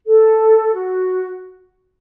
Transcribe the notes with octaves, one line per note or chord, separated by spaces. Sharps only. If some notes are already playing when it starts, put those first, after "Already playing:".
A4
F#4